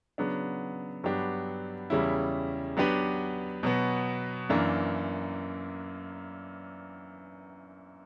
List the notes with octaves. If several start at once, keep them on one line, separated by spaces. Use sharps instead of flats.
C#3 F#3 B3 D4
G2 F#3 B3 D4 G4
E2 C#3 G3 C#4 E4
F#3 B3 D4 G4 B4
B2 F#3 B3
F#2 E3 A#3 D4